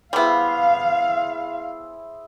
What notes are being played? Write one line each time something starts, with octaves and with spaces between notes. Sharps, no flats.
G3 B3 E4 G#4 C5 F5